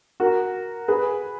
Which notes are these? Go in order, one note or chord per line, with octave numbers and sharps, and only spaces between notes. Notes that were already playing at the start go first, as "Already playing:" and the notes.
F#4 A#4
G#4 B4